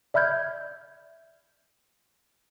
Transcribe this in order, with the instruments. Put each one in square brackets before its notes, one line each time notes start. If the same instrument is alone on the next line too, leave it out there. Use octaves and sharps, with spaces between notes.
[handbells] D5 E5 B5 F6 G6 G#6